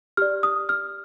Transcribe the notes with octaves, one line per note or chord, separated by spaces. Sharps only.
G4 D5 F6
D#6
F6